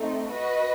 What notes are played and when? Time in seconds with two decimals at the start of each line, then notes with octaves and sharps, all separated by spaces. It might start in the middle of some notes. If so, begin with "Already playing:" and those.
Already playing: A3 C4 D#4
0.28 F#4 B4 D#5